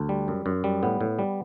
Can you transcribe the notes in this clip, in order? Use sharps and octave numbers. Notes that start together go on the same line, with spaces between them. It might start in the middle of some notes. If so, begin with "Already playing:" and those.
Already playing: D2
G3
F#2
F#2
G3
A2 B3
A2
G3